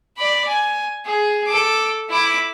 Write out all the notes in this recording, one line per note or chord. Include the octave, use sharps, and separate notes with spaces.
D5 B5
G#5
G#4
A4 D6
E4 D6